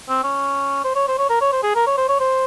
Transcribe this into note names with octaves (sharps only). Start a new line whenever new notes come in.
C4
C#4
C5
C#5
C5
C#5
A#4
C#5
C5
G#4
A#4
C#5
C5
C#5
C5